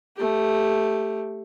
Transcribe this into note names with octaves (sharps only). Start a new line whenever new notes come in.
A3 G4